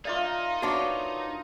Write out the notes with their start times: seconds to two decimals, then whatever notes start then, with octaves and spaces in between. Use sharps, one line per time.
0.05 D#4 F4 A#4 D5 E5 F5 D6
0.62 B3 D4 F#4 C#5 E5 A5